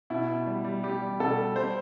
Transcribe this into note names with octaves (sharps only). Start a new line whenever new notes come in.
B2 E4
B2
G3
G3
G3 G4
G3
B2 A4
G3
G3 C5